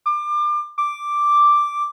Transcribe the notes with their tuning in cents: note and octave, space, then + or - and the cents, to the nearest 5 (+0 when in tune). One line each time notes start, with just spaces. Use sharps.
D6 +30
D6 +0